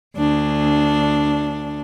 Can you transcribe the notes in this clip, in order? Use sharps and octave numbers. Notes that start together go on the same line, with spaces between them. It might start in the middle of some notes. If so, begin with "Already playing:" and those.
D2 D4